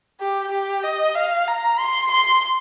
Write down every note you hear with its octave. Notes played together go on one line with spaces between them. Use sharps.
G4
G4
D#5
F5
A#5
C6
C6